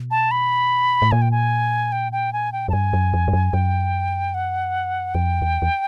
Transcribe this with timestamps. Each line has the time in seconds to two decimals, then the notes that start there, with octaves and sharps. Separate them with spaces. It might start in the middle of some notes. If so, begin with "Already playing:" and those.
Already playing: B2
0.11 A5
0.31 B5
1.02 A2
1.11 A#2 G#5
1.22 G5
1.31 G#5
1.92 G5
2.12 G5
2.33 G#5
2.53 G5
2.68 F#2 A5
2.73 G2 G#5
2.93 F#2
3.14 F2
3.28 G2
3.33 F#2
3.53 F#2 G5
4.34 F#5
5.14 F2 G5
5.42 E2
5.62 E2